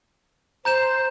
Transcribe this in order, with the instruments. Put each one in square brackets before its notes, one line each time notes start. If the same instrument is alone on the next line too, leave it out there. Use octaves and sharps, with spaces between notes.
[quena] C5 [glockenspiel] A#5 G6 E7